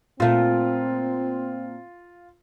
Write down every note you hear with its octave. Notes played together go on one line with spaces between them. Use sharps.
A#2 A3 C4 F4 F5